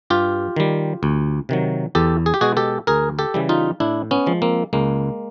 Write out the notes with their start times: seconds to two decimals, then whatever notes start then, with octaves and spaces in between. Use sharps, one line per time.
0.10 G2 F4 G4
0.56 D#3 G3
1.03 D2
1.49 C3 D#3 F#3
1.95 E2 G4 A4
2.26 G#4
2.34 G4
2.41 B2 G#3 F#4 G#4
2.57 G4 A4
2.87 D2 G#4 A#4
3.19 G4 A4
3.34 C#3 E3 G3
3.49 D#4 F4
3.80 A2 D4 E4
4.11 B3 C#4
4.26 F3 G#3
4.42 A#3 C4
4.73 C#2 G#3 A#3